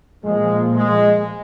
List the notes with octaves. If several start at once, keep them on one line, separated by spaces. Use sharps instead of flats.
A#2 F3 G#3 A#3
G#3